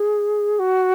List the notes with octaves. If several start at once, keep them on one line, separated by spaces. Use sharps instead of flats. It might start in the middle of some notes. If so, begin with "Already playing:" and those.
Already playing: G#4
F#4